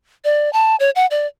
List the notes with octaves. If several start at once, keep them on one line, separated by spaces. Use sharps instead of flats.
D5
A5
C#5
F#5
D5